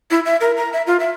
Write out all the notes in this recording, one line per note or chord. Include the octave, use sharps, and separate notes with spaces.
E4
E5
A#4
A#5
E5
F4
E5